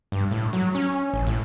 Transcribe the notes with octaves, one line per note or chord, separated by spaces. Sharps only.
G2
A2
F#3
C#4
A1
A2